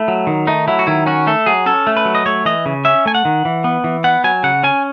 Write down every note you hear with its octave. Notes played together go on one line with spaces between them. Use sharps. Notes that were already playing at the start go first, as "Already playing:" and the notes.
Already playing: A3 E4
F#3
D#3
A3 D#4
F#3 E4
F#4
D#3 E4
C#4 F#4
A3 A4
F#3 G#4
C#4 A4
A3
B4
F#3
D#5
A3 C#5
E3 D#5
C#3
C#4 E5
A3 G#5
F#5
D#3
E3
B3
E3
B3 F#5
F#3 G#5
C#3 F#5
C#4 G#5